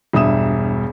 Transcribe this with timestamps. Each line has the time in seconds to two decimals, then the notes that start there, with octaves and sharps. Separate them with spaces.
0.13 E1 G2 E5 D#6 E7